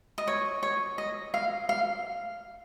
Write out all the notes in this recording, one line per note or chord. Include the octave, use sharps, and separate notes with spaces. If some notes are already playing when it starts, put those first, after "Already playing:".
D#5
C#5
C#5
D#5
F5
F5